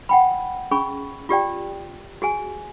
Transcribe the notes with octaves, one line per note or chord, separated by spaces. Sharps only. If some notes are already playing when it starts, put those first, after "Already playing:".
F#5 G5 B5
C#4 G#4 B5 C#6
F4 G4 D5 G5
F#4 G#4 G#5